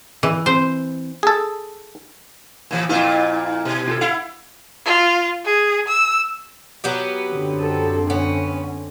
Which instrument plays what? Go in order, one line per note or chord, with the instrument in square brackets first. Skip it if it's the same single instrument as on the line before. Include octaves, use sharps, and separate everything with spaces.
[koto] E3
[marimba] C4 [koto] C5
[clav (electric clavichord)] G#4 A4
[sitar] A#2 E3
[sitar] F2 A#2 F4 [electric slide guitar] E4
[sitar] B2
[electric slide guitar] F4 F#4 A4
[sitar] E4 [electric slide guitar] F5 F#5
[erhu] F4
G#4
E6
[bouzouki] F#3 B3 G4
[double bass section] F#2 D3 C4
[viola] A4
[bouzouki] B3 [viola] C#4